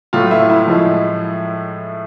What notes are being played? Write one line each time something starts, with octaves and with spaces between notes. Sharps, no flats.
A2 F#3 A3 F4
E4
E4
A2 F3 G#3